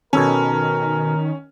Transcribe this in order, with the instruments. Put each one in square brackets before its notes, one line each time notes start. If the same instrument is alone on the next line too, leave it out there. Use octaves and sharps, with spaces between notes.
[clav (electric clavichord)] B2 A4 G#5 [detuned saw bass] D#3 [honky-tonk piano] C#4 [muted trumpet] A#4